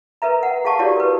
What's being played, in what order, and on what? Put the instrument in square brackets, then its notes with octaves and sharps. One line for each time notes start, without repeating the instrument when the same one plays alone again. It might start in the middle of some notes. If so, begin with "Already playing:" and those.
[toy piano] A#4 B4 E5 A#5
F#5
G#4 F5 F#5 A5 C#6 D6
E4 F#4 G4 A#4 C#5 D5
A#4 B4